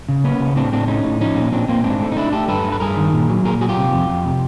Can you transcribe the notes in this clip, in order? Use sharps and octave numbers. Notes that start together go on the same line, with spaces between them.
C#3
A#3 B3 C#4
C#3
A2 C4 D4
A2 C4 D4
A2 C#4 D#4
A2
F3 C#4 D#4
A#2
A#2 C4 D4
A#2 A#3 C4
G#2 C4 D4
A3
D#4
A3 D4 E4
A3 G4 A4
G2 A4 B4
G2
B4
G2 G#4 A#4
D#3
A#2
F#3
A#2 G#4 A#4
F#3 F#4 G#4
F4 G4
C3
F2
F2
C3